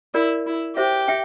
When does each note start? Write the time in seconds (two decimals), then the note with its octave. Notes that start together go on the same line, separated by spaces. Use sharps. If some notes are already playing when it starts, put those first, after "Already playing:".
0.14 E4 A#4 D5
0.47 E4
0.77 G4 C5 E5
1.08 E5 G5